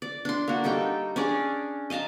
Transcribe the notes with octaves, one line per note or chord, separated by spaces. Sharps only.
D5
D4 C6
A#3 F#4
G3 D#4 A4 G5
C#4 D4 G#4 D5
D#5 F5 A5 A#5